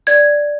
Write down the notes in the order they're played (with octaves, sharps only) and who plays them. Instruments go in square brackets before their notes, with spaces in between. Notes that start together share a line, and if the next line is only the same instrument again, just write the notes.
[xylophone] D5 G#6